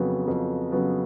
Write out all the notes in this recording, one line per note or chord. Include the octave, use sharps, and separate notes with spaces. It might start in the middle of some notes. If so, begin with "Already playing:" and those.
Already playing: F2 C#3 F#3 B3
F2
C#3 F#3 B3